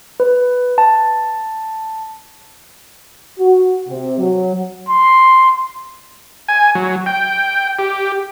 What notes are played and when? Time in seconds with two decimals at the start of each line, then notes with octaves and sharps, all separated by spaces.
0.20 B4
0.78 A5
3.39 F#4
3.88 C3
4.18 F#3
4.89 C6
6.49 G#5
6.75 F#3
7.06 G5
7.79 G4